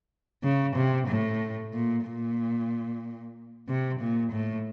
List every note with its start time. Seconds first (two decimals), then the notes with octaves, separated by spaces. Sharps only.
0.43 C#3
0.76 C3
1.08 A2
1.73 A#2
2.05 A#2
3.68 C3
4.00 A#2
4.32 A2